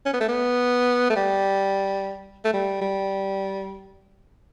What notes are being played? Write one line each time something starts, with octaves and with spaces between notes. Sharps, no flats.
C#4
B3
A3
B3
A3
G3
A3
G3
G3